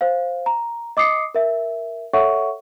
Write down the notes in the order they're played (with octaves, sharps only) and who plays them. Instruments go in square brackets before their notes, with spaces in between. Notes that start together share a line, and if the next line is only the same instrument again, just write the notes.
[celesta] C5 F5
A#5
D#5 D6 D#6 C7 C#7
A#4 E5
A4 C#5 E5 F#5 C#6